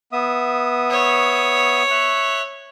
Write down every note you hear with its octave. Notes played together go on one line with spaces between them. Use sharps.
B3 E5 D#6
C#5
E5 F#6